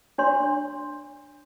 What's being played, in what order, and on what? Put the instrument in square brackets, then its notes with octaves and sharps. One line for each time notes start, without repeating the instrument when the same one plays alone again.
[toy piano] D4 C#5 C6